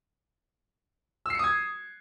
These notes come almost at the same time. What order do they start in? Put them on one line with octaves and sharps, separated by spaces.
E6 C7 C#7 D#6 G#6